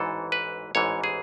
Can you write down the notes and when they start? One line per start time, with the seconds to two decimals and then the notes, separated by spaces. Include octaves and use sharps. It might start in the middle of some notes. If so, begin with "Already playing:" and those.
Already playing: A1 G#2 E3 A4
0.32 B4
0.75 A1 G#2 E3 C#5
1.04 G#4